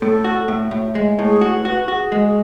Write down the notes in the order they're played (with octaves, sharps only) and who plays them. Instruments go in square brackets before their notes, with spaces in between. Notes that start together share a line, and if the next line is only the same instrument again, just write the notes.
[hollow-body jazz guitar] A2 [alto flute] A4
[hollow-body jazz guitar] F#4
A2
A2
G#3
A2
[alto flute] G#4
[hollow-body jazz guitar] F#4
[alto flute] B4
[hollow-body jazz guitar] F#4
[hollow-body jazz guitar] F#4 [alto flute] G#4
[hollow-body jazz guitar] G#3